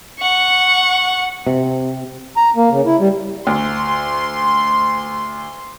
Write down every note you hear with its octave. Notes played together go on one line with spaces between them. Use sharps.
F#5 C#6
C3
A#5
A#3
C#3
E4
G3
D2 C6